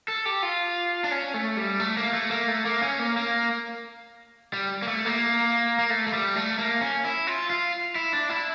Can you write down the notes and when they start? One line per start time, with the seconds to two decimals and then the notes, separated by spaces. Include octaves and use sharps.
0.08 A4
0.26 G4
0.43 F4
1.04 D4
1.11 C#4
1.34 A3
1.57 G3
1.80 A3
1.97 A#3
2.13 A3
2.31 A#3
2.48 A3
2.65 A#3
2.83 C#4
3.00 A#3
3.16 A#3
4.53 G3
4.82 A#3
4.88 A3
5.05 A#3
5.79 A#3
5.90 A3
6.07 A3
6.13 G3
6.36 A3
6.59 A#3
6.81 C#4
7.05 E4
7.27 F4
7.50 F4
7.95 E4
8.13 D4
8.29 E4